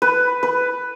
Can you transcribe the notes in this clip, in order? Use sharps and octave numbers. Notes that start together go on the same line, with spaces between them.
B4
B4